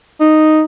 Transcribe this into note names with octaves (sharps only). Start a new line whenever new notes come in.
D#4